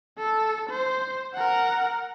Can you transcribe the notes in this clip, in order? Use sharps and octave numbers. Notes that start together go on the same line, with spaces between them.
A4
C5
A#4 F#5